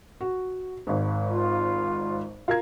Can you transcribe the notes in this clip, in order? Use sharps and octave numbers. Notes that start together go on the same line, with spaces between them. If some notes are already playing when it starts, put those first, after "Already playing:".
F#4
G#1 G#2
F4
F4 A#4 G#6